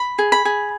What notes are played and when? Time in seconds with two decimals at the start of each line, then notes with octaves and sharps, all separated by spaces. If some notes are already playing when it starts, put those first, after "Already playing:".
Already playing: B5
0.19 G#4
0.32 B5
0.45 G#4